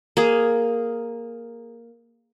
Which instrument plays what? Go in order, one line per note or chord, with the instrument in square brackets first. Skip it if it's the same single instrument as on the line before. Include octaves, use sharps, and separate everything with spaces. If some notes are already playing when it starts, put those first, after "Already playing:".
[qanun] A#3 G#4